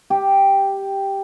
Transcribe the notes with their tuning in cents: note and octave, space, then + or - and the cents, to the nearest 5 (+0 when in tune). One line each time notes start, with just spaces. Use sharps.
G4 +0